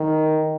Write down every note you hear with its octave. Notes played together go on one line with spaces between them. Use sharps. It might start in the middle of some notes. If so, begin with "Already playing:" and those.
Already playing: D#3